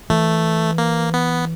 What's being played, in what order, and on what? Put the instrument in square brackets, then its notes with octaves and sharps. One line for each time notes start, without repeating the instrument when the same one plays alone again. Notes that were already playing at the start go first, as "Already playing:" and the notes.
[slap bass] E3 [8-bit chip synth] A3
[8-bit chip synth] A#3
B3